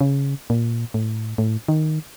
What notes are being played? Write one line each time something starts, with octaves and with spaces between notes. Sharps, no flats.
C#3
A#2
A2
A2
D#3